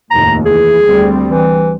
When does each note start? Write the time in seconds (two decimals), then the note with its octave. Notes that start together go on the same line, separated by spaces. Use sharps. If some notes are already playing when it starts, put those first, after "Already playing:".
0.11 F1 D#2 A2 A#5
0.45 E3 G#4
0.84 D2 G3 C4
1.27 E3